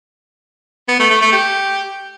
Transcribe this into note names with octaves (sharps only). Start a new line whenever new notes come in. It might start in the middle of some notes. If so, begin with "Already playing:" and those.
B3
A3
A3
A3
G4